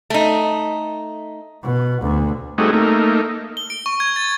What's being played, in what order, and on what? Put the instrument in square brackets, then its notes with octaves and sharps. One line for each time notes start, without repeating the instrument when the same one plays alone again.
[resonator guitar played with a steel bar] A3 D#4
[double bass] B2
D2
[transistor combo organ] G3 A3 C4 D#4 F#4 G#4
A3 A#3 D#4
[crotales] G7
D7
C#6
G#6
A6